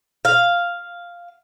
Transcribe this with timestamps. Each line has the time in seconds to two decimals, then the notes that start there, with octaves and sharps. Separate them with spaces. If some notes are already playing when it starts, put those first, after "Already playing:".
0.25 F5